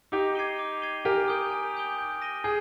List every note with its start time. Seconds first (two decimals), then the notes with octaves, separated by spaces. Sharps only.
0.12 D#4 G4 D6
0.35 G#6 C7 D#7 G7
0.59 D6
0.82 G#6 C7 D#7 G7
1.05 G4 A#4 G#5
1.28 D#6 G6 D7 G7
1.51 G#5
1.74 D#6 G6 D7 G7
1.98 G6
2.22 A#6 D#7 G7
2.44 G#4 G6